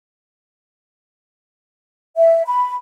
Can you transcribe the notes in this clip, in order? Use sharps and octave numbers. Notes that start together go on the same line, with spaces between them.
E5
B5